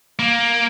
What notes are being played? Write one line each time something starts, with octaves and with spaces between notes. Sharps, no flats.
A#3